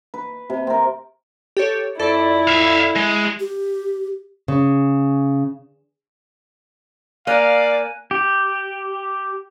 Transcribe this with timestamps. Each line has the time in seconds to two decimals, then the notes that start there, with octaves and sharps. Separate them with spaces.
0.14 B4
0.50 C3
0.67 C4 A#4
1.57 G4 A4 C#5
1.99 F2 E4 A4 D5
2.47 E5 F5
2.96 G#3
3.40 G4
4.48 C#3
7.27 A#3 D5 F5 G#5 F#6 D#7
8.11 G4